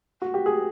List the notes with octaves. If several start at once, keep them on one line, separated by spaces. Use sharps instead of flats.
F#4
G4
G#4